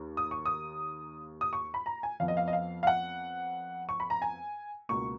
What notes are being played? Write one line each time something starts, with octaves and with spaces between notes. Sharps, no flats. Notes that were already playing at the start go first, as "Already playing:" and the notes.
Already playing: D#2 D#3 A#3
D#6
C#6
D#6
D#6
C#6
B5
A#5
G#5
F2 F3 B3 F5
D#5
F5
D#5
F5
F5
F#5
C#6
B5
A#5
G#5
C#2 B2 A#3 C#6